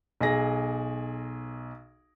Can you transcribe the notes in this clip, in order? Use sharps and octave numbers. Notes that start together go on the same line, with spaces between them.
B1 G#4 A#6